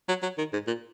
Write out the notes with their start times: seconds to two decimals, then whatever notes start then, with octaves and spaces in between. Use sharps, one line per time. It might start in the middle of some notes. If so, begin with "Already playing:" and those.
0.09 F#3
0.23 F#3
0.38 D#3
0.53 G#2
0.67 A#2